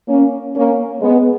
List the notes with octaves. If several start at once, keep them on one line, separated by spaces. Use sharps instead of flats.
A#3 C#4
A#3 C#4
G#3 B3